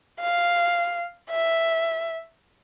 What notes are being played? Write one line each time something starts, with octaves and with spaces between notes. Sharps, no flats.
F5
E5